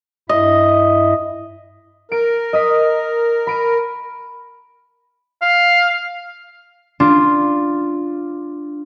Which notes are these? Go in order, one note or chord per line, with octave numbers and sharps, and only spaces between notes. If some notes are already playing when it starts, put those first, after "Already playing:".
G2 E4 D#5 E5
A#4 D7
D#5 D#6 B6
B5 D7 D#7
F5
D4 F4